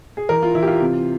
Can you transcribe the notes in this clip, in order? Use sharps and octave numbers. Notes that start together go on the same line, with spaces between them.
G#4
E3 A#4
F4
E3 E4
G4
F4
C3